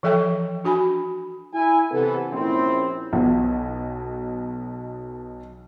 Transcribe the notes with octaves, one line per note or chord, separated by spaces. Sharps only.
E3 F3 A4 E5 G5
D4 F#4 G#5 B5
E4 G#5
C3 E3 B3 A4
A#1 C4 C#4 E4
B1 B2